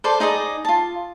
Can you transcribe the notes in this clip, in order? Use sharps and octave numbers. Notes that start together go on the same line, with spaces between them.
A4 B4 C5 D5
D#4 G#4 D5 D#5
F4 A5